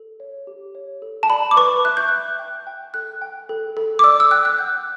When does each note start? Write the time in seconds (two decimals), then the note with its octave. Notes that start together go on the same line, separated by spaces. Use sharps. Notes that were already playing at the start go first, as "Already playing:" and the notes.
Already playing: A4
0.20 C#5
0.47 G4
0.75 C#5
1.02 A4
1.23 A5
1.30 D5 B5
1.51 D6
1.57 B4 C#6
1.85 E5 F#6
1.97 G6
2.08 E5 F#6
2.39 G5
2.67 G5
2.94 A4 F#6
3.21 G5
3.49 A4
3.77 A4
3.99 D6
4.04 D5 E6
4.20 E6
4.31 G5 F#6
4.45 F#6
4.59 F#5 G6